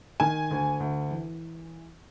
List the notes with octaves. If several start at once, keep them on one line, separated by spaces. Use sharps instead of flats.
D#3 G#5
D2
D2
E3